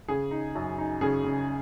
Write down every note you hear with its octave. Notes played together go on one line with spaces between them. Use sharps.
C#3 G#4
D#4
F#2
D#4
C#3 G#4
C#3